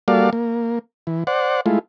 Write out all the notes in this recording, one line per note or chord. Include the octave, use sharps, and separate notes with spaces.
G3 A#3 F#4 A4 D5 F5
A#3
E3
C5 D5 F#5
G#3 A3 E4 F4